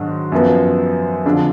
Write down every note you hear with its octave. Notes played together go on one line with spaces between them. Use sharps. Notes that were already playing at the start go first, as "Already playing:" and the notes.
Already playing: G#2 D#3 F#3 D4
F#2 F3 B3
F2 D3 F3 G#3 D4